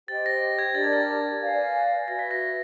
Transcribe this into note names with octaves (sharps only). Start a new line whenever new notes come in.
G4 C5 D#5 G5 A6
A#6
G#6
D4 G4 A#4 D5 A6
G#6
A6
B4 D5 F5 G#5
F#4 B4 E5 A#6
B6
A#6